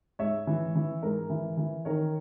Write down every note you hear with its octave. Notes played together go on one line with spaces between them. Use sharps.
G#2 C#5 E5
E3
E3
G#2 A#4
E3
E3
D#3 A#4 C#5